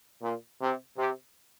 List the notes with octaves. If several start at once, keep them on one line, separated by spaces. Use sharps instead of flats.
A#2
C3
C3